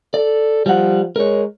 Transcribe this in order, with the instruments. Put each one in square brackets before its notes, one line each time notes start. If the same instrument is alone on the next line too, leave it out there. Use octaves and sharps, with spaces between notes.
[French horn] A4 [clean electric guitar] D5
[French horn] F3 [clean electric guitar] G3 F#5
[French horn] G#3 [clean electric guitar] A#4 C#5